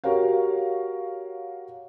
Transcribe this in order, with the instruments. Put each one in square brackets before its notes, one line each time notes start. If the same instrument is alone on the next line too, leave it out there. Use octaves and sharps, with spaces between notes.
[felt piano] F#4 G4 A#4 C#5 F5